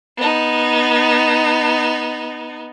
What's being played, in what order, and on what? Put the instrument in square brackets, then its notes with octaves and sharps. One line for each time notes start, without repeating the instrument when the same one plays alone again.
[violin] B3 D#4